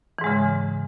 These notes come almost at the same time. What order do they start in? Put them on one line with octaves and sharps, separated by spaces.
E3 G#2 G#3 C#3